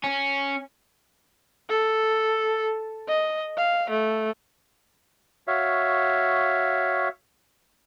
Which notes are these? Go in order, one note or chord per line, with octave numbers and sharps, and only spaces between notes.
C#4
A4
D#5
F5
A3
F#4 C#5 E5 F5